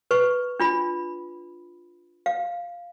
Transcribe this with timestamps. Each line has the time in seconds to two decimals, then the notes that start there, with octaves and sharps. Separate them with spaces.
0.11 B4 C#6
0.60 D4 F4 B5
2.26 F5